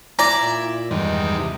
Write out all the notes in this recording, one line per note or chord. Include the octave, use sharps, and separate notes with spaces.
E4 D5 A#5
A#2
E2 G2 D#3 G#3
C3